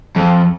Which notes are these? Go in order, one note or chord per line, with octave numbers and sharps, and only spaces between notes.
F2